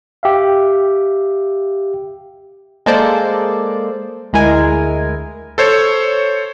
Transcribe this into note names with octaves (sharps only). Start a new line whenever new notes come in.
G4 E5 F5
G#3 A#3 A4 C5 D5
D2 G#3 E4 A#4 G#5
A4 C5 C#5